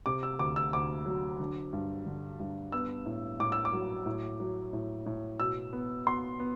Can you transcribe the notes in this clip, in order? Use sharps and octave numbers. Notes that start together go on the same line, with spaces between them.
C3 D6
E6
D2 D6
E6
D2 D6
F#3
D3
G2
D3
G2
B3 E6
A2
A2 D6
E6
D6
F#3
A2
F#3
A2
A2
B2 E6
B3
B3 C6
B3